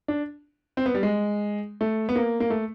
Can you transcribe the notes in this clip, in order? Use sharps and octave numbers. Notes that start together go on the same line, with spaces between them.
D4
C4
B3
G3
G#3
A3
B3
A#3
A#3
A3